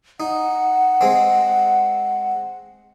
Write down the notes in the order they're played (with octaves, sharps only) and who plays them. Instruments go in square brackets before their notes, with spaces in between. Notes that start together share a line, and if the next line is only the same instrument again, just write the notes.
[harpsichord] D#4 [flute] F#5
[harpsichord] G#3 C4